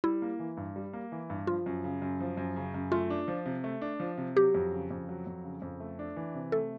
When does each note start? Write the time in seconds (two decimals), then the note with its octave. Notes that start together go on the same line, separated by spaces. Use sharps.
0.04 G3 E4
0.22 A#3
0.39 E3
0.57 G2
0.76 G3
0.93 A#3
1.12 E3
1.30 G2
1.47 F3 F4
1.66 F#2
1.84 C#3
2.02 F#2
2.20 F3
2.37 F#2
2.56 C#3
2.74 F#2
2.92 A3 F4
3.10 D4
3.28 F3
3.46 C3
3.64 A3
3.81 D4
4.00 F3
4.18 C3
4.36 F#3 G4
4.54 F2
4.72 C#3
4.91 F2
5.09 F#3
5.27 F2
5.44 C#3
5.62 F2
5.80 A3
5.99 D4
6.16 E3
6.34 C3
6.52 A3 A4